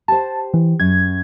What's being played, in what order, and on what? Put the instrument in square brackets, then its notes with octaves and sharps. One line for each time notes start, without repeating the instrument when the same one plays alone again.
[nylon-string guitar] G4 C5 [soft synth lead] A5
[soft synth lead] E3
[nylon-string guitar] F#2 [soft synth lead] G#6